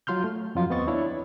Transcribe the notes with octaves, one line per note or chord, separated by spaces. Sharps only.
F#3 F4 C6 F6 G6
A3
F2 F#3 F4 F5
D#2 B3 C4 D#5 C#6 A6
D4 E4 C#5